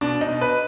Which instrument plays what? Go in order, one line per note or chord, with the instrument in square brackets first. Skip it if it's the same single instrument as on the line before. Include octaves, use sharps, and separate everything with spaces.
[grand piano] B2 D4
D#4
B2
B4